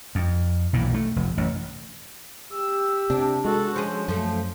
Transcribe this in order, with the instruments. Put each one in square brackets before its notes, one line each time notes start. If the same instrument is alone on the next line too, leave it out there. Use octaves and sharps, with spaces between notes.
[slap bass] F2
B1 A#2 D#3 E3
A3
F1
A1 F#2
[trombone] G4 [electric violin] E6
[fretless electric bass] C3 [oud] D4
[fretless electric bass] G#3 [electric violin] F#4 A4
[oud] F3 G#4 [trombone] C#4 [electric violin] C5
[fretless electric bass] F#2 [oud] F3 A3